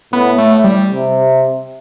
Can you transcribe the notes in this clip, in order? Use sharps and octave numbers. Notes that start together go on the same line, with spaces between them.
A2 B3
A3
G3
C3